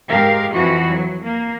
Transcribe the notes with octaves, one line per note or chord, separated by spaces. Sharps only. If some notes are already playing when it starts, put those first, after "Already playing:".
G#2 G4 A#4 F5
F2 E3 F3 F#4
F#3
A#3